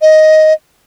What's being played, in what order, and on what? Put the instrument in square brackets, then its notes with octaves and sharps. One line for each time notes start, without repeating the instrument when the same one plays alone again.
[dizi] D#5